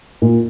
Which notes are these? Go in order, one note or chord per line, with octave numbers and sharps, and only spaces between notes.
A#2